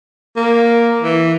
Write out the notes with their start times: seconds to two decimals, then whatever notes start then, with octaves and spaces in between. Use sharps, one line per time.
0.36 A#3
1.02 E3